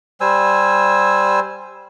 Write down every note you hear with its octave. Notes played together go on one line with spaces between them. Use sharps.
G3 C5 G#5 E6